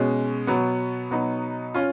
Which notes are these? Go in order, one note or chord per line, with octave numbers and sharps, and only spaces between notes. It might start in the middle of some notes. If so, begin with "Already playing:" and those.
Already playing: B2 G#3 C#4
B2 F#3 B3
B2 F#3 B3 D#4
C#4 F4